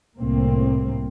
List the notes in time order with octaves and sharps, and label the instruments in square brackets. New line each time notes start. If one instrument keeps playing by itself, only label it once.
[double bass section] C2 A2 A#3 C4